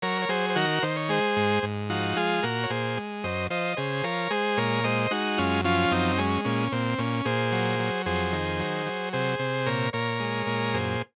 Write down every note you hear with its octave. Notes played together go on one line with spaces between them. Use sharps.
F#3 A#4 C#5
C#5
F#3 G#4 C5
C5
D#3 F#4 A#4
D#3 C5
C#5
G#3 G#4 C5
G#2
G#2
F3 D#4 F#4
G#3 F4 G#4
A#2 F#4 A#4
C#5
A#2 G#4 C5
G#3
F#2 C5 D#5
F3 C5 D#5
C#3 G#4 C5
F3 A#4 C#5
G#3 G#4 C5
A#2 A#4 C#5
G#3 C5 D#5
G#3 D#4 F#4
F#2 C#4 F4
F3 C#4 F4
F#2 C4 D#4
G#3 C#4
A#2 C#4
A#2 C4
A#2 C#4
A#2 G#4 C5
F#3
F#3
F2 G#4 C5
D#3
F#3
F#3
C3 G#4 C5
C3
A#2 A#4 C#5
A#2 A#4 C#5
G#3
A#2
F#2 G#4 C5